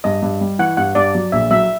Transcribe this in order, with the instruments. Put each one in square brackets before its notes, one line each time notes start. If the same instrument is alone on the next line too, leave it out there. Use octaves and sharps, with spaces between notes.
[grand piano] G2 [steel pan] D#5
[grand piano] G2
G3
[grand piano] E3 [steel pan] F#5
[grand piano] G2 [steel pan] F#5
[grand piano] G2 [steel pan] D5
[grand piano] F#3
[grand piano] A#1 [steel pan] E5
[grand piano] F#3 [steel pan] E5